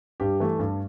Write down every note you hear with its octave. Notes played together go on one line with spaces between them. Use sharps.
G2 G4
E3 A3
G2